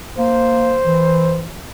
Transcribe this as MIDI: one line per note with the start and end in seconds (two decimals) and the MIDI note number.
0.18 0.78 58
0.18 1.42 72
0.85 1.50 52